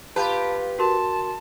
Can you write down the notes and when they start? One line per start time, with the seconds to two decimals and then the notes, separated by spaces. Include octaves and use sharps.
0.16 F4 G4 B4 A5 B5
0.79 F#4 A#4 A5 C6